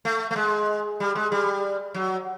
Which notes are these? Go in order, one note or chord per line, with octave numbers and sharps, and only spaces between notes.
A3
A3
G#3
G3
G#3
G3
F#3